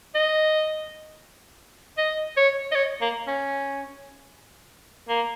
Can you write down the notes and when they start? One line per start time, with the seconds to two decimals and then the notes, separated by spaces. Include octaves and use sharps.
0.15 D#5
1.98 D#5
2.37 C#5
2.71 D#5
2.75 C#5
3.01 A#3
3.27 C#4
5.09 A#3